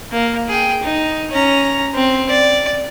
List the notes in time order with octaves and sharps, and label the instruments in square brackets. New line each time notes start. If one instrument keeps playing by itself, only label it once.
[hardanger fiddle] A#3
G#4 G5
D#4
C#4 A#5
C4
D5